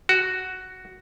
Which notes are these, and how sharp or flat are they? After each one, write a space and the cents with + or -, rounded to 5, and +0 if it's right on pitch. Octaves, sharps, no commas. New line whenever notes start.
F#4 +5